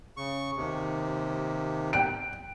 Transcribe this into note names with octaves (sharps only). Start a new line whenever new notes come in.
C#3 C#6
D#2 C3
G5 F#6 D7